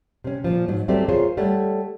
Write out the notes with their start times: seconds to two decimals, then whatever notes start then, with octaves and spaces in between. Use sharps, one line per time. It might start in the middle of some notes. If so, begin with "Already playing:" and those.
0.24 C3 C#4
0.44 A#2 F3
0.68 G#2 F#3
0.88 F#3 G3 A3 C4 G4 D5
1.08 F4 G#4 A#4 C5 C#5
1.37 G3 A3 C#5 F#5